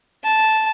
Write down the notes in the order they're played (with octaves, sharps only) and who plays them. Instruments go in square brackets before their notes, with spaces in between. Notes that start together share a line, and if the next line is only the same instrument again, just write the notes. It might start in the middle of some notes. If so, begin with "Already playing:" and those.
[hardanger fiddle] A5